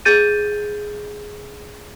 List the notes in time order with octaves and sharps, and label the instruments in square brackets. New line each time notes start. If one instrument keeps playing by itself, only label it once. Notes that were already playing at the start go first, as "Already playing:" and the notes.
[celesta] G#4 G6 A6 D#7